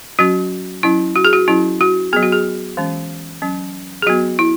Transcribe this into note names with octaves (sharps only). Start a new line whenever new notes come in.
F#3 C#4 F#4
F#3 C#4 E4
F#4
G#4
F#4
F#3 C#4 E4
F#4
F#3 B3 G#4
F#4
G#4
E3 G#3 C#4
F#3 C#4
G#4
F#3 B3 F#4
E4